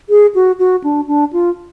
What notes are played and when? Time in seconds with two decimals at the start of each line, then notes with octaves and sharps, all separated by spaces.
0.09 G#4
0.35 F#4
0.59 F#4
0.84 D4
1.08 D4
1.33 F4